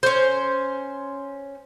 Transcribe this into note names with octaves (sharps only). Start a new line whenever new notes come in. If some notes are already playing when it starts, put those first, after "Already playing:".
C#4 C5